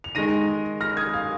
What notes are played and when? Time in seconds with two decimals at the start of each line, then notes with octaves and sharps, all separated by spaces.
0.04 F7
0.15 D#3 G#3 A#6 D#7
0.81 F6 A#6
0.97 D#6 G#6
1.14 F5